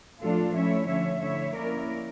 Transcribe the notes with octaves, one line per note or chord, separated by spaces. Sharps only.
A2 F3 A3 D4 F4 A4
F3 A3 C#4 E4 C#5 E5
D3 F3 A3 C#4 C#5 E5
D3 A3 E4 C#5 E5
F3 A#3 C#4 E4 A#4 D5